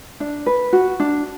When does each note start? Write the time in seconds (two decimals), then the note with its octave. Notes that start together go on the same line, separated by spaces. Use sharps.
0.20 D4
0.46 B4
0.73 F#4
1.00 D4